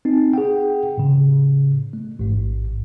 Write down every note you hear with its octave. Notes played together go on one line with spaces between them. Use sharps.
C4 D#4
G#4 F#5 G5
A2 C#3
A3
A1 G#2